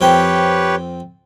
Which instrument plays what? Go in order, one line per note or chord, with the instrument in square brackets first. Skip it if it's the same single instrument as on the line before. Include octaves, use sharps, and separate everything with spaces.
[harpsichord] F2 C4 G5 [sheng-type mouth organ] G4 B4 C#5